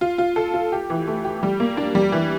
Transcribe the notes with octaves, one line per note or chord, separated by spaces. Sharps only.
F4
F4
A4
F4
G4
E3
A3
G4
G3
A#3
D4
G3
E3